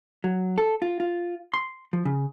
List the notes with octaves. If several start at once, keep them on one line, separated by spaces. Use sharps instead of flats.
F#3
A4
F4
F4
C6
F3
C#3